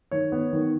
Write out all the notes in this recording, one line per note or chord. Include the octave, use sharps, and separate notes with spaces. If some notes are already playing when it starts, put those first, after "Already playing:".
D#3 C#5
B3
D#3